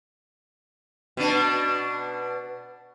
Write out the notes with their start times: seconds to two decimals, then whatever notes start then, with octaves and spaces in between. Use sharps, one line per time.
1.17 B2 D4